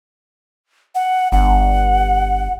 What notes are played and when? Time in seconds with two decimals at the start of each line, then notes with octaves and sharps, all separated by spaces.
0.95 F#5
1.32 G1 F#5